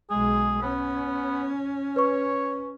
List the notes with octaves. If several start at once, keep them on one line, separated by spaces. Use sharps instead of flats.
B1 G#3 G#4
B3 C#4
B4 C#5 C#6